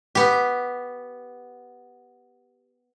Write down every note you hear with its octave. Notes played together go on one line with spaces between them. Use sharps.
B3 G4